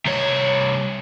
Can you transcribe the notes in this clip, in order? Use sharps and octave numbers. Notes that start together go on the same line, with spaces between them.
C2 C#5